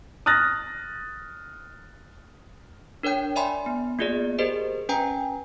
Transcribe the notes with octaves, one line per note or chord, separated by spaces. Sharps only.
D#6 F6 F#6 A6 A#6
D4 A#4 C#5 G5 G6
D5 E5 G#5 B5 C6
B3
A#3 B3 F4 G#4 D5
G4 G#4 A#4 C5 D#5
C#4 B4 G5 G#5 A#5